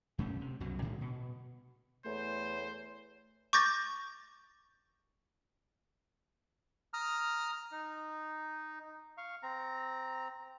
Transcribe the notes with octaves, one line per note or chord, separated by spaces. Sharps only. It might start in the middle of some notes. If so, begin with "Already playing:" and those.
F#2 B2 A3 C#4
C3
C2 F#2 B2 F#3
A2 D3 D#3 G#3
B2
E2 A3 C5 C#5
C#6 D6 G6 A6 A#6
A#5 D#6 F6
D#4
F5 C#6
C4 A#5